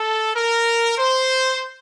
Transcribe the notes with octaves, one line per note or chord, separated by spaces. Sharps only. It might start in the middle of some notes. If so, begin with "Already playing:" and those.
Already playing: A4
A#4
C5